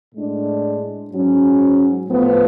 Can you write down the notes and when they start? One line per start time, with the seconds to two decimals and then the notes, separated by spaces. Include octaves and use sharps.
0.15 A2 G#3 D4
1.11 G#2 F#3 C#4
2.07 A2 F3 B3